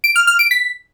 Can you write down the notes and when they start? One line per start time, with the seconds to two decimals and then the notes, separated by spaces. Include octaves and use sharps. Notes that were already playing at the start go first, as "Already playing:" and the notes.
0.04 D7
0.16 F6
0.27 F6
0.39 D7
0.51 B6